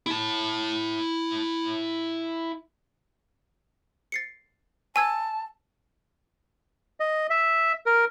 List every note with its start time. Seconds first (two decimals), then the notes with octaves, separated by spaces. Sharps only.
0.07 E4 A5
4.12 A6 C7 C#7
4.96 G#5 A5 E6 G#6
7.00 D#5
7.30 E5
7.86 A#4